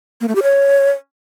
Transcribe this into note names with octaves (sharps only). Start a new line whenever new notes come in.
A#3
A3
G4
C#5